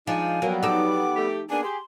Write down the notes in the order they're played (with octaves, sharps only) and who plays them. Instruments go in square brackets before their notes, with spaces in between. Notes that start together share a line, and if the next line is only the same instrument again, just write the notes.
[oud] F3 [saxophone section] G#3 D4 D#4 [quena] G#5
[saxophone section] F#3 [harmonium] G3 B3 [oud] A#3
[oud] D#4 A4 [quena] D6
[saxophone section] A3 G4
[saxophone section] A#3 B3 D4 [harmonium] G#4 [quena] G#5
[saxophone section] G4 [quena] C6